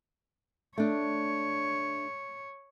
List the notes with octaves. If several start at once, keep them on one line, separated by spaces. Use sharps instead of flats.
A3 D4 C#5